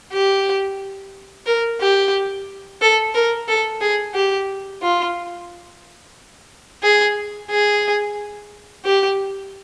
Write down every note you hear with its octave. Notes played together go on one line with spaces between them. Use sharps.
G4
A#4
G4
A4
A#4
A4
G#4
G4
F4
G#4
G#4
G4